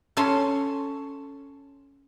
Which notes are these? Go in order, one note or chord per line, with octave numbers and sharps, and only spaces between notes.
C#4 A4 A5 C6